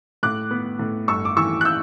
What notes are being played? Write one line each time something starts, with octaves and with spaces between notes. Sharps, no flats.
A2 D6 F#6
B3
A2
G1 C#6 E6
D6
E3 C#6 E6
F#6
E6 G6